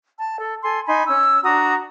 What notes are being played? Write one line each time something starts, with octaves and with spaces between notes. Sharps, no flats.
A5
A4
A4 G#5 C6
D#4 G#5 B5 C6
C#4 E6
D4 F#4 A#5 D#6